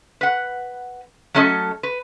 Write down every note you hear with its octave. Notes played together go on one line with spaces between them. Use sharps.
B4 F#5
F#3 A3 C#4 A4 C5 D#5
B4